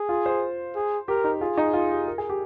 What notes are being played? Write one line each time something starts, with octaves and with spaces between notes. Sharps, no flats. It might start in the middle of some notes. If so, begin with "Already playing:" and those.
Already playing: G#4
F4
C5
G#4
G4 A#4
D#4
F4 G#4
D#4
F4
G4
A#4
G#4
G4